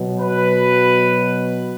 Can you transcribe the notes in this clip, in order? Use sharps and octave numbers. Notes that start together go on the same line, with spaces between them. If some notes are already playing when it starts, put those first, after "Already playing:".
Already playing: B2 F#3
B4